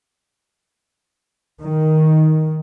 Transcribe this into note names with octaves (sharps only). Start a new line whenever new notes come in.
D#3